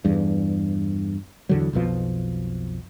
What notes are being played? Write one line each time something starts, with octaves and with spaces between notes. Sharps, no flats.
E2 G2
E2 D3 F#3
B1 F2 B2 F3